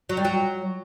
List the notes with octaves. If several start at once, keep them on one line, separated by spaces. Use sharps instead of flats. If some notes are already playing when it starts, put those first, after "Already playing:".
F#3
G3
F#3